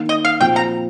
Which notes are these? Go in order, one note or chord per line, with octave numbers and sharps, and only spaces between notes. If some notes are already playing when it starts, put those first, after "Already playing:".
Already playing: D#3 A#3 D#4
D#5
F5
A#2 F3 C4 G5
A#5